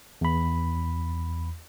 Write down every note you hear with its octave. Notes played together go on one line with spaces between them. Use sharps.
E2 B5